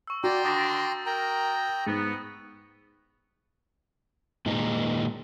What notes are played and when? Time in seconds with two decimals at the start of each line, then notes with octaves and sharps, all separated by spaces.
0.07 C#6 E6
0.24 F#4 D5 G5 A#5 C6
0.45 D3 D#3 D4 D#6 A6 A#6
1.06 A#4 G5 A#5
1.87 G#2 B3 A6
4.46 A#2 D#3 G#3 D#4